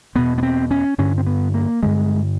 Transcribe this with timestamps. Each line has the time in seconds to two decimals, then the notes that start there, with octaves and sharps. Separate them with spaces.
0.15 E2 B2 B3
0.38 B3
0.43 C4
0.71 C#4
0.98 G2 D3 C#4
1.18 C4
1.27 B3
1.54 A#3
1.83 G2 D3 G#3